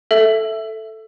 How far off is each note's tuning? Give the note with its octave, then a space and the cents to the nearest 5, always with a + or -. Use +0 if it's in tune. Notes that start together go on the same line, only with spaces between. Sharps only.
A4 +0 E5 +0